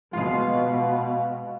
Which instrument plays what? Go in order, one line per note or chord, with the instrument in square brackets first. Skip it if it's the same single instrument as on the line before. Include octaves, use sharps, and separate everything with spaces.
[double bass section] B2 [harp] G#3 F4 [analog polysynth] F5